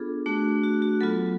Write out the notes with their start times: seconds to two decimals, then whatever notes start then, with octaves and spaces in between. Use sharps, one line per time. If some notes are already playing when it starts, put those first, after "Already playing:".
Already playing: B3 D4 F4 G#4 A4
0.26 A3 D4 F#4
0.63 F#4
0.82 F#4
1.01 F#3 B3 F4 A4